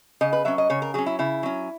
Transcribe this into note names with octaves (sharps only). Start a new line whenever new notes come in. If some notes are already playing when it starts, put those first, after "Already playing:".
C#3 D#5
B4
F#3 C#4 E5
D#5
C#3 C#5
A#4
F#3 C#4 G#4
E4
C#3 E4
F#3 C#4